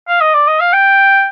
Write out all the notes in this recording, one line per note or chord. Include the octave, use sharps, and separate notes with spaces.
F5
D#5
D5
D#5
F5
G5